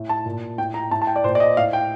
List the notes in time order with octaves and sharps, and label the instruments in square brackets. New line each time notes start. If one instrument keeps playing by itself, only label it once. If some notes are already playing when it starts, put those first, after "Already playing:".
Already playing: [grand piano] A2
A5
A#2
A2 G5
A#5
A2 A5
A5
G5
D5
A#2 C5
D5
D#5
A2 F5
G5